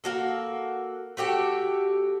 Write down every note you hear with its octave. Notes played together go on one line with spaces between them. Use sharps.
A#3 F#4 A4
A3 F#4 G4 A4